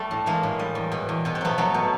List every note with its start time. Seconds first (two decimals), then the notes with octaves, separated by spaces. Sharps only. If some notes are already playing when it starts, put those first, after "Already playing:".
Already playing: G3 A3
0.11 A2
0.26 E3 G#3 A#3
0.43 A2
0.59 G3
0.75 E2
0.92 B2
1.09 E2
1.25 B2 B3
1.35 C4
1.41 F#3 A3 B3
1.58 F#3 A3 B3
1.74 B2